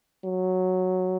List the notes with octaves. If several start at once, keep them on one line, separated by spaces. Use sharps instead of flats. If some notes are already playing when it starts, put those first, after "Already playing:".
F#3